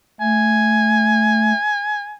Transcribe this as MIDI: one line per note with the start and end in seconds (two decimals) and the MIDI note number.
0.21 1.53 57
0.21 2.16 80